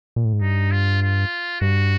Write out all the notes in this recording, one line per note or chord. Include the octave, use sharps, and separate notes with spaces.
A#2
A2
G#2
G2 D#4
F4
F4
G2 F#4